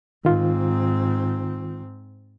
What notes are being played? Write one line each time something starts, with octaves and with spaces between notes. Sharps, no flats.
G#2 D#3 C4 F4